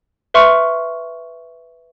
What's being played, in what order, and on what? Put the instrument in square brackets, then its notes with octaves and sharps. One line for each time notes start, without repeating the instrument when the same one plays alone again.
[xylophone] B4 E5 C6 C#6 F6 C#7